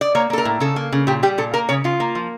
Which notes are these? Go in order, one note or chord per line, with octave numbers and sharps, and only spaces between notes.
D5
A#3 C#5
A#3 A4
A#4
A2
C#3 A4
A#3
C#3
A#2 G4
G3 G4
A#2 A4
A#3 A#4
C#3 C#5
C#3 F4
A#3
F3